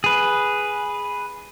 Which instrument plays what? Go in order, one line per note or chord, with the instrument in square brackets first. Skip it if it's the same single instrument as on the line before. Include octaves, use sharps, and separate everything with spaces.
[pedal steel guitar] G#4 B4